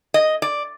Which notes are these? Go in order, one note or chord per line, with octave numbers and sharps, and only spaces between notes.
D#5
D5